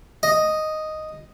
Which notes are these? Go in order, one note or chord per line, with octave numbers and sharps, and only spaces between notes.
D#5